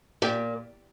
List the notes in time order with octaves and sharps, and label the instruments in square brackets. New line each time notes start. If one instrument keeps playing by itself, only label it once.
[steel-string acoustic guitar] A#2 G4